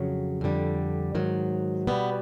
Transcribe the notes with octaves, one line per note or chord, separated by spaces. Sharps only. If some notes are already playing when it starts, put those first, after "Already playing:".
Already playing: F2 C#3 F#3
F2 D3 G3
G#2 D#3 F#3
B2 G3 B3